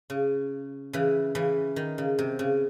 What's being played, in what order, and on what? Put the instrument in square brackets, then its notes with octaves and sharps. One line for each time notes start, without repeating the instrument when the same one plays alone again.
[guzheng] C#3
C#3 E3
C#3 E3
D#3
C#3
C3
C#3